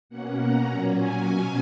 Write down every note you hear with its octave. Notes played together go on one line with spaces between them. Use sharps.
B2 A#3 C#4 F#5
A#5
A#2 F#3 C#4
G#5
B2 F#3 C#4